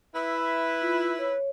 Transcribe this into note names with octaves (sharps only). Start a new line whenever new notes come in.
E4 B4 E5
F4
C#5